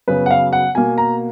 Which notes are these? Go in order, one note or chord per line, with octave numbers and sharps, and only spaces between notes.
F#2 C#3 F#3 B3 B4
F#5
F5
F#5
B2 A#3 G#5
A#5